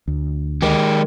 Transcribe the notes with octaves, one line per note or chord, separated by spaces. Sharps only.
D2
D#3 G#3 G4